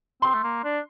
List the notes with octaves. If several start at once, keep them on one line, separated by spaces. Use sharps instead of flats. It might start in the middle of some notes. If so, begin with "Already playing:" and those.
C4 C6
A3
A#3
D4